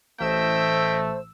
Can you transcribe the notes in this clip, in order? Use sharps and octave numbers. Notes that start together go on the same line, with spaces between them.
A1 A3 C5 D#5 E5 G5 E6